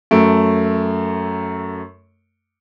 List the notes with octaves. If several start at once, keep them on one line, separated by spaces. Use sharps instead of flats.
F#2 A3 D7